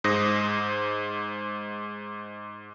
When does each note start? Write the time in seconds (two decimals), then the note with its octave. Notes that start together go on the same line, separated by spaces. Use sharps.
0.04 G#2 C5 D#6 A#6